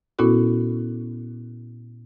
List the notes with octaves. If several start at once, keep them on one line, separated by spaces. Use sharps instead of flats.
A#2 B3 C#4 E4 F#4 A4